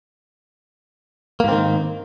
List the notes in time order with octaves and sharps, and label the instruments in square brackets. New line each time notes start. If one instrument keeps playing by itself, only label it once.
[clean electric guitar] A#3
G#2
C4
D#3